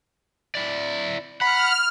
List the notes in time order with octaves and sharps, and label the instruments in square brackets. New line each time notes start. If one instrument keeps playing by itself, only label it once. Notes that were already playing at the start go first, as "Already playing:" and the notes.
[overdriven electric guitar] E4 D5
[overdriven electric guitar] F#5 [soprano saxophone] B5 [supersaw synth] F6